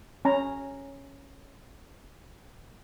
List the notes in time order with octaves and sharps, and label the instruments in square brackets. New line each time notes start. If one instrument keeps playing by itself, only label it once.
[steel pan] C#4 A#5